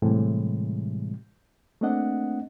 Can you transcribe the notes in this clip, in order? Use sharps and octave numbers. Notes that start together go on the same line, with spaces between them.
A2 C3 E3 G3 G#3
A3 A#3 C4 D4 D#5 F#5